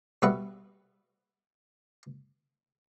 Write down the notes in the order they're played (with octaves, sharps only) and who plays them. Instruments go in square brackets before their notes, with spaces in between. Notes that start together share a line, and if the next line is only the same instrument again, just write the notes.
[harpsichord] B2 G3 B4 E5 F#5 C#6